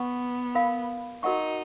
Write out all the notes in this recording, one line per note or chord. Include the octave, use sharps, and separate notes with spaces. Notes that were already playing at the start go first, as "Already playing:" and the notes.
Already playing: B3 B4 F#5 C#6
A#4 F5 B5
D#4 F#4 A#4 D#5 F#5 C#6